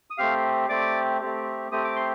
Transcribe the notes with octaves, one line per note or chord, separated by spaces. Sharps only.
D#6
A3 C4 G4 F5 F6
A3 C4 G4 D5 D6
A3 C4 G4
A3 C4 G4 D#6
D6
C6